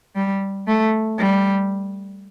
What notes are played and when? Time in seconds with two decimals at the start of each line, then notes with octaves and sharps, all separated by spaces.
0.16 G3
0.67 A3
1.19 G3